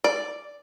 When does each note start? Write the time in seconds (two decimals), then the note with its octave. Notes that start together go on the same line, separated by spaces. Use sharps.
0.04 D5